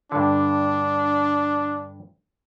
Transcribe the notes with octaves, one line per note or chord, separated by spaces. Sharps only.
G2 D3 D4